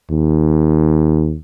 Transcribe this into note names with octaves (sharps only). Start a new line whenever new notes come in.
D#2